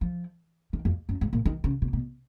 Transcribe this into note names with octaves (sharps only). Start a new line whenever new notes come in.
F3
D#3
F2
F#2
G#2
A#2
D#3
C#3
B2
B2